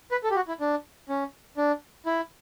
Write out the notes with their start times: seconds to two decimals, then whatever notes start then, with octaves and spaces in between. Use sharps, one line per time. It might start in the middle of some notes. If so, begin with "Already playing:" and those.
0.11 B4
0.24 A4
0.31 G4
0.36 F#4
0.48 E4
0.60 D4
1.09 C#4
1.57 D4
2.06 E4